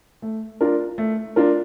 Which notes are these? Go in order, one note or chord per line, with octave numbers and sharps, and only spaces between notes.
A3
D4 F4 A#4
A3
D4 F4 A#4